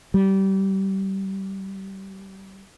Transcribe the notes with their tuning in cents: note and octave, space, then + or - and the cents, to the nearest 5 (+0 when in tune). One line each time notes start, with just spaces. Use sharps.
G3 -25